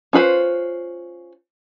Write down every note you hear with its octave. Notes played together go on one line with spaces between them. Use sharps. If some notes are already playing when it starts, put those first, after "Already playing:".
C#4 F4 B4 C5